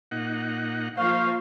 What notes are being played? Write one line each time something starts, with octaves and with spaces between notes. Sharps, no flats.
A#2 D#4 F#5
F3 A#3 D#4 C5 F5 C#6